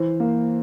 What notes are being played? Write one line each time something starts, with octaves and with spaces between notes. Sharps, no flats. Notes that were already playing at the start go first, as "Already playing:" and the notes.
Already playing: E3 C5
A#3